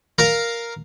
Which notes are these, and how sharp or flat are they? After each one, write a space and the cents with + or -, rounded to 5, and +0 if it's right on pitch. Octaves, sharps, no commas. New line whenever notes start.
A#4 +0 F5 +0 A#5 +0